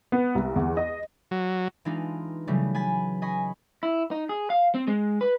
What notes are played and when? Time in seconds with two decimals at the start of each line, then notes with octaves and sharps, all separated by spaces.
0.12 B3
0.35 C2
0.56 E2
0.77 D#5
1.31 F#3
1.85 E3 G#3 D4 D#4 F4
2.47 C#3 E3 F#3 G3 A3
2.75 G#5 B5 A6 B6
3.22 D#5 G#5 B5 C#6
3.83 E4
4.11 D#4
4.29 G#4
4.50 F5
4.75 C4
4.87 G#3
5.21 B4